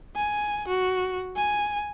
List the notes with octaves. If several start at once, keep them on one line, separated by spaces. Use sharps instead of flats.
G#5
F#4
G#5